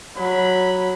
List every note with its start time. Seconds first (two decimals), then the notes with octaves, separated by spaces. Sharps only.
0.17 F#3 B5